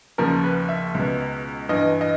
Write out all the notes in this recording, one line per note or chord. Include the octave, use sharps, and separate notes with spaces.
D#2 C#3 F3 A#4
B4
E5
C#2 B2
G2 E3 D#5
D#5